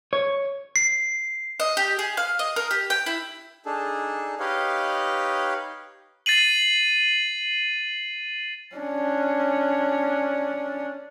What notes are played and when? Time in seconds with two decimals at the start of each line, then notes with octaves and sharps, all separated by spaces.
0.13 C#5
0.76 C7
1.60 D#5
1.77 G4
1.99 G#4
2.17 F5
2.39 D#5
2.56 A#4
2.71 G4
2.90 G5
3.06 E4
3.66 D4 D#4 G#4 A4
4.40 D#4 G4 B4 C#5 D#5 F5
6.26 A6 C7 D#7 F#7
8.76 C#4 D4